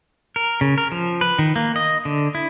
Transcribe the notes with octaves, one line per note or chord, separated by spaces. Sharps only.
A#4
C#3
A#4
F3
B4
D#3
A#3
D#5
D3
E4